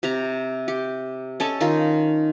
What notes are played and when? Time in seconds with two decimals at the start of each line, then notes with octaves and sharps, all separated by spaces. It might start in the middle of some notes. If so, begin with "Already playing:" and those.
0.03 C3 G4 A#5
0.68 G4
1.40 C#4 A4 D#5 A5
1.60 D#3 D#4 F4 A#4